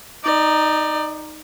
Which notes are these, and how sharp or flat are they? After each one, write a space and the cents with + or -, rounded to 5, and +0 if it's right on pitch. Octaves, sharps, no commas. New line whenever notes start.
D#4 +0 D5 +25